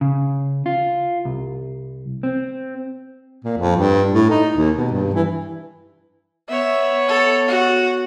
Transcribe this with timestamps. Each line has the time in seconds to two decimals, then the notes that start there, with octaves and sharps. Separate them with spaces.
0.01 C#3
0.66 F4
1.25 C2
2.23 C4
3.44 A#2
3.58 F2
3.76 G2
4.13 A2
4.30 D#4
4.56 D#2
4.77 B2
4.91 G2
5.14 E3
6.49 B3 C#5 E5
7.08 A4
7.48 F#4